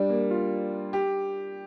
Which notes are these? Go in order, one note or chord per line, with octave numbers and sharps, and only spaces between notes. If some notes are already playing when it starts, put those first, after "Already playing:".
Already playing: G3 D4
A#3
F4
G4